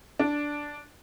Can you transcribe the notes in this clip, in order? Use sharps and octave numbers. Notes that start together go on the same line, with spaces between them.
D4